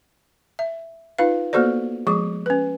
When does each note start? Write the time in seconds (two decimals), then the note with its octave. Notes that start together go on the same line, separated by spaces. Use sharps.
0.59 E5
1.19 D#4 F4 B4 F5
1.53 A#3 B3 F#4 A4 C5 D5
2.07 F3 G#3 G#4 D6
2.46 C#4 B4